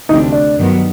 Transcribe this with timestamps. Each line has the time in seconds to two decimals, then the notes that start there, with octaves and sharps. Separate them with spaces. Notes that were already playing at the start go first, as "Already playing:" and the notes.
0.09 D2 C3 E3 A3 D4 D#4
0.32 D4
0.57 G2 D#3 F#3 B3